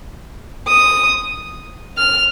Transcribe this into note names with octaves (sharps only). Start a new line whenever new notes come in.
D#6
F6